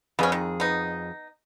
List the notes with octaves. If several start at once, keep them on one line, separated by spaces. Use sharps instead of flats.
F2 B3 C#4 G#4
D#3
B3 D#4